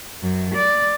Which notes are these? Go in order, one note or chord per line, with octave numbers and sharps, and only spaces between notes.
F#2
D5